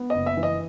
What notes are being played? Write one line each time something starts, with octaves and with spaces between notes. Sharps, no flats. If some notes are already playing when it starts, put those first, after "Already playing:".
Already playing: B3
F#1 D#5
E5
E3
D#5